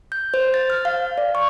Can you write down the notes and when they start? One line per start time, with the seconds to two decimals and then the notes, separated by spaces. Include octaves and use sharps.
0.12 G6
0.34 C5
0.54 A6
0.70 F6
0.85 F5
1.18 D5
1.35 C#6